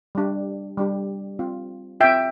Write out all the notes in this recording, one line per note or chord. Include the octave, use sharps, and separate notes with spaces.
G3 D4 G4
G3 D4 G4
C4 F4
C4 F4 E5 G5